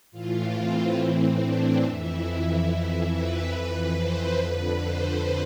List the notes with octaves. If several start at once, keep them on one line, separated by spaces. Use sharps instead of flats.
A2 E3 F4
C4
A2 E3
D4
F2 E3 E4
F2 E3
B4
F2 E3
C5
F2 D3 B4
C5